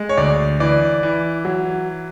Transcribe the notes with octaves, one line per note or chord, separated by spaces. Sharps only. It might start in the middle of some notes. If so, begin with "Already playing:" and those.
Already playing: G#3
C#5
D2 D5
E3 D5
E3
F#3